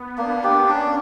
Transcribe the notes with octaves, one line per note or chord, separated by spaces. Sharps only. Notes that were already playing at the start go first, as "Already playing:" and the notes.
Already playing: B3
A#3 D4
G4
C#4 D4